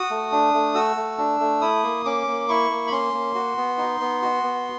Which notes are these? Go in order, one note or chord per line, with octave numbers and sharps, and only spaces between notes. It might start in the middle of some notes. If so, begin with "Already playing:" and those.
Already playing: F#4 D#6
A3
D4
A3
F#4 E6
A3
D4
A3
E4 D#6
A#3
C#4 D6
A#3
E4 C#6
A#3
B5
C#4 C6
A#3
F#4
B3
D#4
B3
F#4
B3